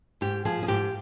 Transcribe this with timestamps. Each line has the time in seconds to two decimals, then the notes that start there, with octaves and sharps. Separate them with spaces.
0.21 G#2 G4
0.45 F3 G#4
0.63 G#4
0.68 G#2 G4